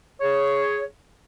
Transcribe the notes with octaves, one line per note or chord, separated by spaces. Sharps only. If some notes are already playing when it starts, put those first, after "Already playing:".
G#4 C#5